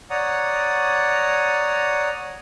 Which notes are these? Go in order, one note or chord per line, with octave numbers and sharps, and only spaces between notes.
C#5 D5 F#5 A#5 D#6